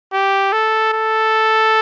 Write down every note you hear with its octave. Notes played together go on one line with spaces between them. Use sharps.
G4
A4
A4